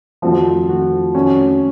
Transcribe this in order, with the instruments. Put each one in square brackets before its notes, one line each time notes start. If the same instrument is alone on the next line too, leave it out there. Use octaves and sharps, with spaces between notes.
[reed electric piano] F2 D#3 A3 C4 F#4 [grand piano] F3
[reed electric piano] F2 D#3 A3 C4 F#4
[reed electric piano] F2 D#3 A3 C4 F#4 [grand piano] C#4